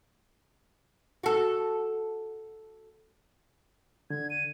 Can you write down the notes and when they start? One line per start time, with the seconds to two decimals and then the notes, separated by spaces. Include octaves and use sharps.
1.23 F#4 A4
4.10 D3 G#6
4.30 D#7